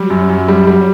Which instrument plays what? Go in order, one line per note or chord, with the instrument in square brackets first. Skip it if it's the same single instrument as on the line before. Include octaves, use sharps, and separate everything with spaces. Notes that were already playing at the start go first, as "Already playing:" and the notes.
Already playing: [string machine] F#3 [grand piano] G3
[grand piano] F#2
F#2
G3
G3